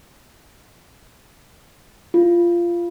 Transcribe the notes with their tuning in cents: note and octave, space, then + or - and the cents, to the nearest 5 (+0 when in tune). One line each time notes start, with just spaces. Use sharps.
F4 -15